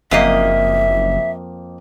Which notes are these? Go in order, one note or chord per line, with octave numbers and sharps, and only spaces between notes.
F#1 F2 A#3 D#5 E5